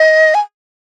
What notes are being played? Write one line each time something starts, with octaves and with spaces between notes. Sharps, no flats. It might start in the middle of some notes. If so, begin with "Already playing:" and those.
Already playing: D#5
G#5